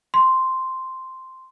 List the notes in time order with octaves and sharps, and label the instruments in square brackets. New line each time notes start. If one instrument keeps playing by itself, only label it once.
[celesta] C6